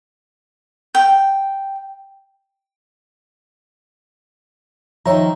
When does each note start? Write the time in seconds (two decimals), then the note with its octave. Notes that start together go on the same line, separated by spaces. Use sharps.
0.95 G5
5.06 D#3 F3 C#5 E5 A#5